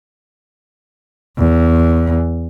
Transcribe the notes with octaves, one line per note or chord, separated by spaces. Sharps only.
E2